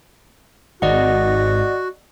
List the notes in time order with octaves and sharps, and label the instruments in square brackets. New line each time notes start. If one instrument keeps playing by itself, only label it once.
[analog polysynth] G#1 [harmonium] F#4 [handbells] D5 D#5 F#5